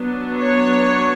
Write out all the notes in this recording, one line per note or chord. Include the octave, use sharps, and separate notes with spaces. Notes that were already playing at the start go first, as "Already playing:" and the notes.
Already playing: F#3 B3 D4
C#5